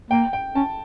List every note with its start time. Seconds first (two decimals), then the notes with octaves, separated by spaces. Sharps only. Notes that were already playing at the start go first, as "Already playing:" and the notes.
0.11 A#3 G5
0.33 G5
0.55 C#4 A5